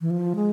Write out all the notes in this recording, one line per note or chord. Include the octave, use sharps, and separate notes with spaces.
E3
F3
G#3